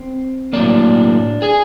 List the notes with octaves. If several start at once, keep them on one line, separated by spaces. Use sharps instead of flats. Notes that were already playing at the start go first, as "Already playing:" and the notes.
Already playing: C4
A2 F#3 A#3 D4 D5
G#4 G#5